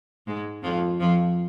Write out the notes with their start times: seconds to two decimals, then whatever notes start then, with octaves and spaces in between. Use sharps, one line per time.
0.27 G#2 G#3
0.63 F2 F3
1.00 F2 F3